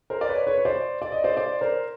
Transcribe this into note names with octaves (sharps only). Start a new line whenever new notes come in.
A#4 C5
D5
B4 C#5
B4 C#5
C#5
C5 D5
D5
D#5
C5 D5
C5 D5
A#4 C5